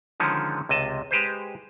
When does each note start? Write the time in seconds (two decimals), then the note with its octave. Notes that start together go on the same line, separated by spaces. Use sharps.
0.20 D3 D#3 F3 G#3 C#4
0.69 C#2 C3 D#5 A5
1.11 G#3 G4 B4 C5